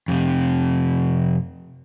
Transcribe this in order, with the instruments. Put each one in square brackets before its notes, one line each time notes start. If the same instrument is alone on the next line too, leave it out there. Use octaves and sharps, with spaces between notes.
[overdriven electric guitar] F2 C3